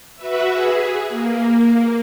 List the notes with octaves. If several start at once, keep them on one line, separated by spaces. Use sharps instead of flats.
F#4 B4 E5
G#4
A#3